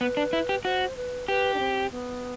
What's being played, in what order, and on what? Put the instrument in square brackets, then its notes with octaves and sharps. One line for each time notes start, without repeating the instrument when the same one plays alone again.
[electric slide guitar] B3 [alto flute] B4
[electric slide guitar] D4
E4
G4
[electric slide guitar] F#4 [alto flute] C5
[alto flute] B4
[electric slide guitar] G4 [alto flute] B4
[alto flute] D4
C4
B3